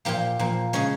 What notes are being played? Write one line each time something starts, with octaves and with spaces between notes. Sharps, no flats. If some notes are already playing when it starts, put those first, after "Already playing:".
A#2 F3 A#3 G4
A#2 F3 A#3
C#3 G#3 C#4